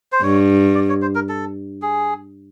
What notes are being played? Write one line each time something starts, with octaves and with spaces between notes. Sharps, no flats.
C5
G2 C#5
D5
C#5
C5
A#4
A4
G#4